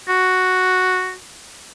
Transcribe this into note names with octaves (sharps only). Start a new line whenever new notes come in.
F#4